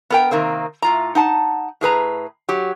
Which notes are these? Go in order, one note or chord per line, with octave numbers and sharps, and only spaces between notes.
B3 A#4 G5
C3 D#3 A#3 C4
A2 F4 A#5
D#4 F#5 A5
A2 G#4 B4 A#5
F#3 G4